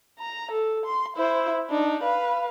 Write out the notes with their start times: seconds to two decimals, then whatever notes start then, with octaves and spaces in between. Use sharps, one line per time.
0.19 A#5
0.51 A4
0.86 C6
1.17 E4 C5
1.70 D4 D#4
2.03 B4 F5